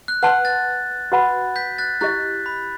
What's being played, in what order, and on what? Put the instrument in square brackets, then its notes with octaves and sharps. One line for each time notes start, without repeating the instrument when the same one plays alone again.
[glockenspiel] F#6
[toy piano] B4 F#5 A5 C6 [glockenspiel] F#6
[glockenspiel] F#6 A6
[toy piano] F#4 B4 F#5 B5
[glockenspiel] G6 B6
F#6 A6
[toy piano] E4 G4 D#5 [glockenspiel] F#6 A6
[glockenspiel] B5